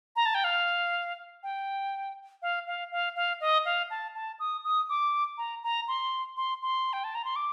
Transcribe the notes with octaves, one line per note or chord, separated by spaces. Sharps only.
A#5
A5
G5
F5
G5
F5
F5
F5
F5
D#5
F5
A5
A5
D#6
D#6
D6
A#5
A#5
C6
C6
C6
G5
A5
A#5
C6
D6